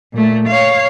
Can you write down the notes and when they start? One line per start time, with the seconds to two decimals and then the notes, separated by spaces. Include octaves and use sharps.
0.13 A#2 A3
0.48 C#5 F5